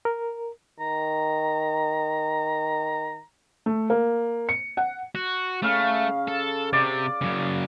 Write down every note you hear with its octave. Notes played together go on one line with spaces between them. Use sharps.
A#4
D#3 A#5
A3
A#3
C#7
F#5
F#4
C#3 A3 F5
A4
C3 D5
F#2 C#3